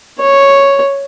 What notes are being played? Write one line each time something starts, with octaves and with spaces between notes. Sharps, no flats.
C#5